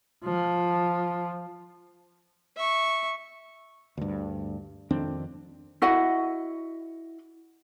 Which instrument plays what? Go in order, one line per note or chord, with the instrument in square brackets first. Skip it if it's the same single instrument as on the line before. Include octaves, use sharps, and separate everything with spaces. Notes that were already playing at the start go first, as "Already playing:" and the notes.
[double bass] F3
[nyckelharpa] E5 C#6
[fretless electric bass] D2 G2
F2 D#3 C4 D4
[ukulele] E4 F#4 D#5 F#5